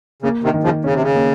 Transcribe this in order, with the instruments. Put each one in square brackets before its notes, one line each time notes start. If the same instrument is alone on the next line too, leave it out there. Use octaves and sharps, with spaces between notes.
[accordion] C#3 [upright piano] A#3
[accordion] C3 D#3
[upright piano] D#3
[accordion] C#3 F3
[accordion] C#3 [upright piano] C#4
[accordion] C3
C#3
[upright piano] A#3